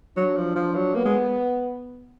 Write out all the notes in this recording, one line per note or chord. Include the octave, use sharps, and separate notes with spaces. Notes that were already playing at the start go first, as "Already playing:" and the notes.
F#3 D4
F3
F3
F#3
A#3 B3
G#3